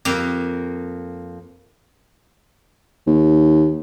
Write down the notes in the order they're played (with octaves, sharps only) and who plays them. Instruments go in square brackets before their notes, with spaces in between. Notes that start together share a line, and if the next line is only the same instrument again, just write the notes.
[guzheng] F2 A#3
[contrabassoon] D#2